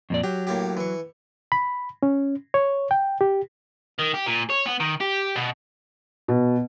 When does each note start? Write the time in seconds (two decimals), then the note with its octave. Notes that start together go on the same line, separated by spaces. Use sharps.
0.10 F2 A#2 D5
0.24 F#3 G4
0.47 A2 A#3 G4
0.77 E3 C#6
1.52 B5
2.03 C#4
2.54 C#5
2.91 G5
3.21 G4
3.99 D#3
4.14 G4
4.26 A#2
4.50 C#5
4.66 B3
4.80 D#3
5.01 G4
5.36 B2
6.28 B2